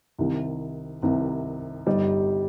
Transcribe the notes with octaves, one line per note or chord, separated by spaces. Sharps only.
C2 C3 D#3
C2 C3 D#3
G1 G2 G3 D#4